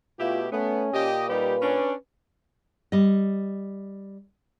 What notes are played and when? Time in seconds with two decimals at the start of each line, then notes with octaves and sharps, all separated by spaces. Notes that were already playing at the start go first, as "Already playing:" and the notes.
0.20 B2 A3 E4 F4 G4
0.52 A3 B3 C#4
0.93 A#2 G4 D#5
1.29 G3 D#4 G4 B4
1.62 C#4 D4
2.92 G3 D#5